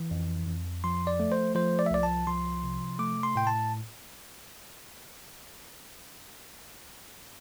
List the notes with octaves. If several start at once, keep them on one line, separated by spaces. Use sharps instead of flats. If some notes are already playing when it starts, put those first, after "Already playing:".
Already playing: E3
F2
F2
F3 C6
D5
A3
C5
F3 C5
D5
E5
C2 D5
A5
F3 C6
C3
A3 D6
C6
A2 G5
A5